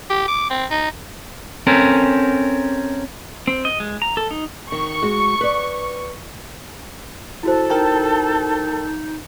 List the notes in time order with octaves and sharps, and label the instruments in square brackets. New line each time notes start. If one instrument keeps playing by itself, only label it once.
[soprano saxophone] G4
D6
C4
D#4
[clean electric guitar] C4 C#4 A4 A#4
[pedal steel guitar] C4
D#5
G#3
A#5
A4
D#4
[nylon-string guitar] D#3 [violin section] C#6
[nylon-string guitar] G#3 F#4
B4 D5
[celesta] E4 F#4 C5 [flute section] A4
[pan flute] D#4 [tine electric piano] A#4 G5 A5